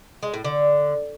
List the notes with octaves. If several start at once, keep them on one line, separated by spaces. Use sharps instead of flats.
G#3
A2
D3